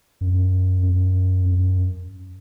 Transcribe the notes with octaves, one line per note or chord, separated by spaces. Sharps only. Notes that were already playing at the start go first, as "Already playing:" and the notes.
F#2
F#2
F#2